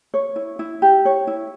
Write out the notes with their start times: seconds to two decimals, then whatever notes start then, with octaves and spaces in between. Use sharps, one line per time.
0.14 C#5
0.36 E4
0.59 E4
0.82 G4
1.05 C#5
1.27 E4